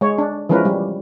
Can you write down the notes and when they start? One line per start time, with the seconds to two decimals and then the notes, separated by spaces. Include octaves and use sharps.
0.01 G#3 C#5
0.18 D4
0.49 E3 F3 G#3 C#4 A#4 B4
0.65 G3